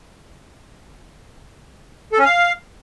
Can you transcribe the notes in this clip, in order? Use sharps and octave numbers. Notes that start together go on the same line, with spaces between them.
A4
C#4
F5